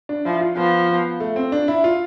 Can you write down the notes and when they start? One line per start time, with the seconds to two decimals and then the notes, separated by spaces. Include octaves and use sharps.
0.09 D4
0.25 F3 E4
0.41 F4
0.57 F3 B3
0.89 B3
1.20 A3
1.36 C4
1.52 D4
1.68 E4
1.84 F4